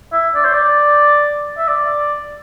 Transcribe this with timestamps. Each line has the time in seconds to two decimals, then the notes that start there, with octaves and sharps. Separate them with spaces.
0.13 E5
0.35 D5
0.45 C5
0.54 D5
1.57 E5
1.67 D5